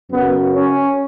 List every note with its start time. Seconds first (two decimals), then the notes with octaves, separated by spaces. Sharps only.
0.11 F#2 C#3 F#3 B3
0.53 C#4